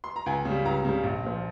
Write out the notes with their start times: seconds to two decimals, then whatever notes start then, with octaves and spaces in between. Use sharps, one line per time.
0.04 C6
0.16 A#5
0.26 C#2 G#5
0.45 C#3 G3
0.65 C#2 A#5
0.85 C#3 G3
1.03 A#1
1.23 A#2 F3